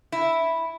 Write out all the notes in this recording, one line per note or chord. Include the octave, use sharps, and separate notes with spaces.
E4